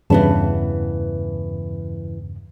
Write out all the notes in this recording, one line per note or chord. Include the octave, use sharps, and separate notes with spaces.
E2 G2 C#3 E3 B3 A5